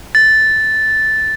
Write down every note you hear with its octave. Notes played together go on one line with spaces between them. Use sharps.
A6